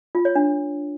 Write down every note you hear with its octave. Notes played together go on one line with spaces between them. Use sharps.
F4
C#5
D4